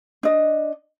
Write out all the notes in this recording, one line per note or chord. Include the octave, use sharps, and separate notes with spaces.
D4 D#5